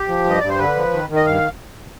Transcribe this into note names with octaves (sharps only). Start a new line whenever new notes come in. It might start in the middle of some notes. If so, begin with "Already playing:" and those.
Already playing: G4
F3
G2 D#5
G2 D5
C5
D3 B4
F3
D#3
D#3
D#5
G2 F5